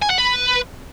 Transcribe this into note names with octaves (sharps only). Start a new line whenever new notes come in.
G#5
F#5
B4